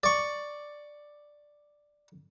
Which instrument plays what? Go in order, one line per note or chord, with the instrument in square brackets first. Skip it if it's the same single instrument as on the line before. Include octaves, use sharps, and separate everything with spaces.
[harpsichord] D5 C#6